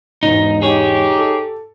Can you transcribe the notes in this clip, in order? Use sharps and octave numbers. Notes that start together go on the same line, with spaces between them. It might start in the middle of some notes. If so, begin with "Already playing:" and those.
E1 E2 G#2 D#4
D#4 G4 G#4 C#5
A4